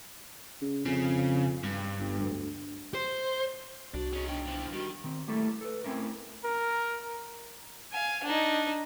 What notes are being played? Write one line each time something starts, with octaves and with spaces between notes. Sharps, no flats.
C#3
F2 C#3
G2
G1
D2
C5
C2 D4 F#4
C#4 D#4 G#4
B2 D4 G5
E3 F3
D#3 G3 F#4
D#3 C4
G3 A3 A#3 E4 A4
A4 B4
A3 C4 C#4 E4 A#4
A#4
F5 G#5
D4 D#4